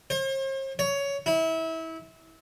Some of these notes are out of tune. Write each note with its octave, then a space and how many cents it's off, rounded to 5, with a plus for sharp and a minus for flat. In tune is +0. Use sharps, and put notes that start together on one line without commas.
C5 +45
C#5 +15
E4 -25